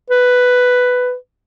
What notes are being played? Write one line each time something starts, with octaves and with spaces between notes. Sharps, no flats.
B4